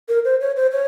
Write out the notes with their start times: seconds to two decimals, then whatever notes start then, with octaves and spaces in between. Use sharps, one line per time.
0.09 A#4
0.25 C5
0.41 C#5
0.56 C5
0.72 C#5